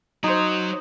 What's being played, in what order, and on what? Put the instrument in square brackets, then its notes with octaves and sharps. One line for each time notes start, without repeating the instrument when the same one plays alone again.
[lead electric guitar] F#3 [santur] D#4 C5